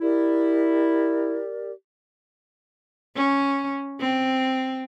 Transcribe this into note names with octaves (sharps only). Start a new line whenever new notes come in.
E4 G4 A#4 D5
C#4
C4